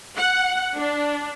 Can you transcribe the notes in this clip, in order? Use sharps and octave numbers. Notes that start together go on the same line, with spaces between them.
F#5
D4